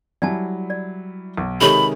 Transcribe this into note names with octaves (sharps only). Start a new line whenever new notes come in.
F#3 G3 E4 D5 G#5 A5
D5
B1
C3 D#3 G#3 G4 A4 C#5 B5